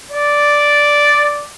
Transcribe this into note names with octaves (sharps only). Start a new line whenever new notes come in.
D5